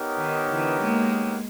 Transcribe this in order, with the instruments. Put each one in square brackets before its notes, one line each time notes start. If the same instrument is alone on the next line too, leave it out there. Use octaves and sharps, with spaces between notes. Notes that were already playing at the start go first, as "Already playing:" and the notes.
Already playing: [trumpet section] B3 D#4 G4 A#4 C#5
[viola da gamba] D#3
D3 E3
G#3 A#3